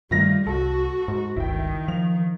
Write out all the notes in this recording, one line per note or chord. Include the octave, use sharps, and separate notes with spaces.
G2 D#3 G3 A3 F4 A#6
C2 F#4 A4
G#2
G1 C#2 D#3 E4 G5
F3 F7